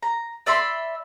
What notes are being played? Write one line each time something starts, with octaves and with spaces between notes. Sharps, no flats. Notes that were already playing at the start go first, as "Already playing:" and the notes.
A#5
D5 E5 B5 C6